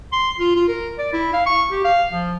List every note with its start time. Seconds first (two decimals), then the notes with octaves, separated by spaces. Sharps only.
0.12 C6
0.39 F4
0.55 F4
0.68 A#4
0.98 D5
1.13 E4
1.34 F5
1.46 C#6
1.71 G4
1.84 F5
2.11 F3